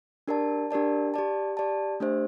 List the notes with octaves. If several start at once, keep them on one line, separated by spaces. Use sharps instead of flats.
D4 G4 A#4 D5 A5
D4 G4 A#4 D5 A5
G4 D5 A5
G4 D5 A5
A3 D4 G4 C5 E5